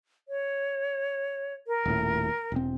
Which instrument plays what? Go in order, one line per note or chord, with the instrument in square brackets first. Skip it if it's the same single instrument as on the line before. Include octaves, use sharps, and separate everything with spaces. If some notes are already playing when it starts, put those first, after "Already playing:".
[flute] C#5
A#4
[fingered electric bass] D#1 A2
E1 C4